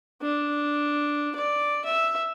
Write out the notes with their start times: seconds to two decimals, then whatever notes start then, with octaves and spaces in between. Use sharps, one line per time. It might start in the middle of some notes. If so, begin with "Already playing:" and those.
0.22 D4
1.35 D5
1.85 E5